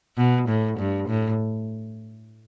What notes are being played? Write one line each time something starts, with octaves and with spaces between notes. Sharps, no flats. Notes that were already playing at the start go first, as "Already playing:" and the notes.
B2
A2
G2
A2